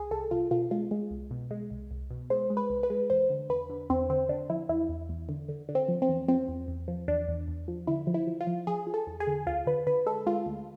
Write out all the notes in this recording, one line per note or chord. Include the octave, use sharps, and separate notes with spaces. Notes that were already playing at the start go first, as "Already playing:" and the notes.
Already playing: C2 G#4
C2 A4
C2 F4
B2 F4
G#3 F4
G#3
C2
B2
G#3
C2
C2
B2
G#3 C5
G#3
B4
C2
B4
G#3
E2 C5
D3
E2 B4
D3
E2 C4
D3 C4
D3 D4
F3 E4
E2 E4
E2
E2
D3
D3
D3
C4
F3
C4
E2
F3 C4
E2
E2
F3
E2 D4
E2
E2
F3
D3 E4
F3
E4
F3
F4
F3
F3 G#4
F3
A4
E2
G#4
D3
D2 F4
D3 B4
D3 B4
G#3 A4
G#3 F4
D2